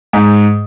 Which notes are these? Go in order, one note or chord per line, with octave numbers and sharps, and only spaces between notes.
G#2